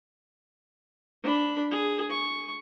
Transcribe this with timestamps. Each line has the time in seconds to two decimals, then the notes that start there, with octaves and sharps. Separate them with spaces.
1.23 D4 B5
1.71 G#4
2.10 C#6